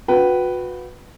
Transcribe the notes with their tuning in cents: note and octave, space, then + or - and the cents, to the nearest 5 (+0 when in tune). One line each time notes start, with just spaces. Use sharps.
F#4 -35 B4 +0 G5 -35